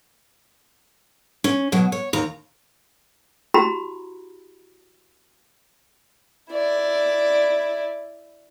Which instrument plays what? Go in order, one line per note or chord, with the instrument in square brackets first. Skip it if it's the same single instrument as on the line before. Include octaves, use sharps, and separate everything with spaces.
[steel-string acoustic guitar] C#4
B2 F#3
C#5
D#2 A#5
[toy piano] E4 F#4 G4 A#5 B5
[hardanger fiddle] E4 D5